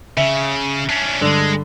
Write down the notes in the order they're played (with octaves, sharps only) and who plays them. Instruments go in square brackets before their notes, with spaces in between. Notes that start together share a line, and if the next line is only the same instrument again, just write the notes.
[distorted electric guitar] C#3 [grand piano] E5
[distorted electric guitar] C#4 D4
[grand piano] G2 D3 [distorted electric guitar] G#3